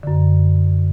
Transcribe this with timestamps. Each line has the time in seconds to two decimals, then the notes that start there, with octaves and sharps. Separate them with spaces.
0.03 F#2 D3